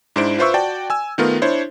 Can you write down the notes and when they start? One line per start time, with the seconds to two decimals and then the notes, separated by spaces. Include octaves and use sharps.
0.16 G#2 D4 E4 C5 D7
0.38 F4 B4 C5 E5 C#6 E6
0.54 F#4 D5 G5 A5
0.90 G#5 E6
1.18 D#3 A3 B3 F4 A#4
1.42 D4 E4 C5 C#5